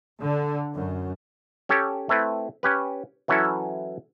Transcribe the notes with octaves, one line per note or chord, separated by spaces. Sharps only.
D3
F#2
C#4 G4 A4 C#5
A3 C4 E4 B4
C#4 G4 B4
E3 F#3 C#4 E4 A4